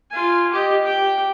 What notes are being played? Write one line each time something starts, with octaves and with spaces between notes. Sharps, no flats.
F4 G#5
G4 D#5
G4 G5